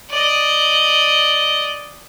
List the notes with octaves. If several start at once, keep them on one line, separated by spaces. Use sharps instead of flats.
D5 D#5